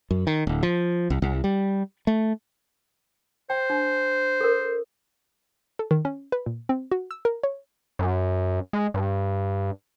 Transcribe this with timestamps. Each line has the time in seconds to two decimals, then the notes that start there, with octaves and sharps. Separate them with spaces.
0.11 F#2
0.27 D#3
0.47 D1
0.63 F3
1.10 C2
1.22 C2
1.44 G3
2.07 A3
3.50 C5 G5
3.70 D4
4.41 A4 A#4
5.79 A4
5.91 D#3
6.05 C#4
6.32 B4
6.46 A#2
6.69 C4
6.91 F#4
7.11 E6
7.25 A#4
7.43 C#5
7.99 F#2
8.73 G#3
8.94 G2